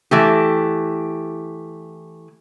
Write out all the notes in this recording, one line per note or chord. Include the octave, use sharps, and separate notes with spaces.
E3 A3 G4